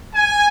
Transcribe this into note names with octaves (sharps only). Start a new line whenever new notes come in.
G#5